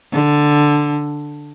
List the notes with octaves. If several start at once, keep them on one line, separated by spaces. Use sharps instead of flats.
D3